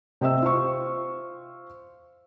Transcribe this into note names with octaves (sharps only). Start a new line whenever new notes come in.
C3 C4 D#5 E5 E6
F4 C5 C#6